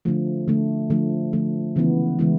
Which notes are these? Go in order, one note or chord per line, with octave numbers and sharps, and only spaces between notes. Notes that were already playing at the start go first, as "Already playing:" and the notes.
D3 F3 A3
D3 F3 A3
D3 F3 A3
D3 F3 A3
C#3 E3 G#3 B3 E4
C#3 E3 G#3 B3 E4